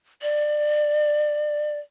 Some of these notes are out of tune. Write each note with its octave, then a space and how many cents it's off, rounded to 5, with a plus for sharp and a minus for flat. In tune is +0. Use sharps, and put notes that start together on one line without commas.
D5 +25